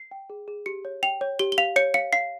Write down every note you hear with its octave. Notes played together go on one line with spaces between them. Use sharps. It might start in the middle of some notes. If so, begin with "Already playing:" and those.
Already playing: C7
G5
G#4
G#4
G4 C#7
C#5
G5 F7
C#5
G4 G7
G7
F5 F7
C#5 C#7
F5 C#7
F5 C7